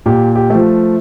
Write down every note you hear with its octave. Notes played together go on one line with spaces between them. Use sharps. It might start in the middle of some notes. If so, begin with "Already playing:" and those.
A#2 G4
G4
F3 A3